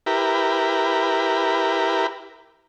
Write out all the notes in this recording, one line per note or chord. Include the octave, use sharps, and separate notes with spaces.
E4 G4 A#4 B4